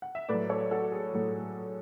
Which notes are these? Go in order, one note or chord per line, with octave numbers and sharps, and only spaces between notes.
F#5
E5
A2 F#3 B4 D5
A4 C#5
F#4 A4
G#4
A2 F#3